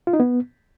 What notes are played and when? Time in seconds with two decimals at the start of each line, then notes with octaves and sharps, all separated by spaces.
0.07 F4
0.13 D#4
0.20 B3